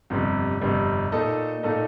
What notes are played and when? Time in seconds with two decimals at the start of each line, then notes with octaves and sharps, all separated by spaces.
0.10 G1 F2 C3 G3
0.61 G1 F2 C3 G3
1.12 A#2 A3 D#4 A4 D#5
1.63 A#2 A3 D#4 A4 D#5